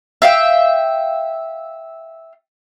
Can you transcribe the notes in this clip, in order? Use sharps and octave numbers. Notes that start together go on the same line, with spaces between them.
E5 F5 G5